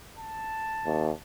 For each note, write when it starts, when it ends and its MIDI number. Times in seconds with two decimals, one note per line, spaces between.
0.17 1.18 81
0.86 1.11 39